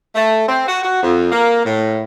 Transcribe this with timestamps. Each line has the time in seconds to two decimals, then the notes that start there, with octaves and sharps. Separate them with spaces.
0.15 A3
0.48 C4
0.67 F#4
0.83 F#4
1.03 F2
1.31 A#3
1.65 A2